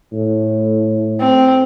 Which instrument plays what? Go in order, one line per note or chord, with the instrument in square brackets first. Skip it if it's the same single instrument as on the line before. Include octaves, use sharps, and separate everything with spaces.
[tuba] A2
[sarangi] C4